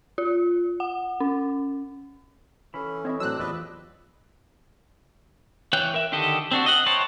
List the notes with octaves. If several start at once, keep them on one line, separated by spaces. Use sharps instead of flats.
F4
F#5
C#4
E3 C#4 A4 B5
C4 E4 C#5 D#5
A2 F#3 C4 D4 E6 F#6
E2 F4 G4 B4 D5 D#5
E3 C#5 G5 F#6 G6
A#4 E5
D3 D#3 G4 A4 D#5
C4 D4 F#4
D#5 F#5
E4 C5 C#5 G5 A5